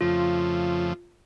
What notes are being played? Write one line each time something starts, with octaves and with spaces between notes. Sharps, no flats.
F2 C#3 F3 A3 F4